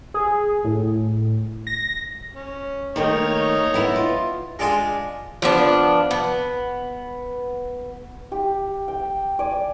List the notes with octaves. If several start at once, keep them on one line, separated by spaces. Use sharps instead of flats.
G#4
A2
A#6
C#4
D#3 A3 A#3 D#4 C#5 D#5
B3 E4
F4
G#3 D4 F4 G#4
F3 B3 D4
B3
G4
G5
D5 G#5